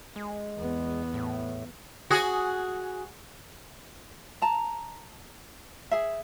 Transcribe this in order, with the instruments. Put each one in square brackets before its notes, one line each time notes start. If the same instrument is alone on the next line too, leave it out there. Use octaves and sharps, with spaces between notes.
[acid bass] G#3
[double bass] E2 B3
[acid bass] A2
[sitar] F#4 G#4
[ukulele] A5 A#5
G#4 E5